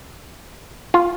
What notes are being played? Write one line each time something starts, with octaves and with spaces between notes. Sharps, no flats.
F4